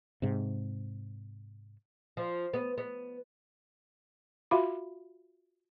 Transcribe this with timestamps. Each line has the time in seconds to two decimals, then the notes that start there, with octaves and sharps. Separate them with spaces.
0.22 G#2 C3
2.17 F3
2.53 B3
2.78 B3
4.51 F4 F#4 E5 F5 B5 C6